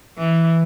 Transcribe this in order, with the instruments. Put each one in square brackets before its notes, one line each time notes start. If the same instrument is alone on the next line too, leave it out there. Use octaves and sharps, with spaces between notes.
[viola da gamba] E3